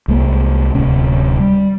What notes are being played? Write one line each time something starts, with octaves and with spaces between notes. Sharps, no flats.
C2 G#3 A#3
D1 C3 C#4
G3